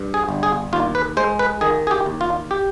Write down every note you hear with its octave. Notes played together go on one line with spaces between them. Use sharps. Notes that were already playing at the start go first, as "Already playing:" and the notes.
Already playing: G2
G#4
G1
G#4
D#2 F4
B4
G#3 C5
B4
D#3 G#4
G#4
G4
D#2
F4
G4